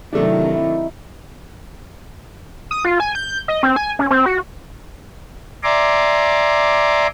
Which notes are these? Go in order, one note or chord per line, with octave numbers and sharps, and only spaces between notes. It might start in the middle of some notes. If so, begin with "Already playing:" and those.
C3 D#3 E3 F#3 A3 D4
D#4 E4
D#6
F4
G#5
G6
D#5
C4
G#5
C#4
C4
F#4
D5 E5 G#5 A#5 C6 D6